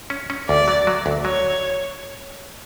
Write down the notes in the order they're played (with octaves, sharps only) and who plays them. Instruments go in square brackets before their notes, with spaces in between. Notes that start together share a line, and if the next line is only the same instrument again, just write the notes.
[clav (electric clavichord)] C#4
C#4
[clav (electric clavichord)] D2 [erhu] D5
[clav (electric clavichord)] F#3
F#3
D2
[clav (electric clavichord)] F#3 [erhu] C#5